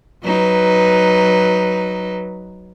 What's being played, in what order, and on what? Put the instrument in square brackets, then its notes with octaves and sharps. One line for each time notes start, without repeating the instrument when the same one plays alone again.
[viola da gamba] F#3 D#4 B4